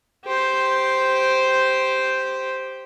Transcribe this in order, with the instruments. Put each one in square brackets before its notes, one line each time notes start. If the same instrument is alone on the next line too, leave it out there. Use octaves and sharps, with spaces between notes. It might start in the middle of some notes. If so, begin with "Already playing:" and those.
[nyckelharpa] G4 C5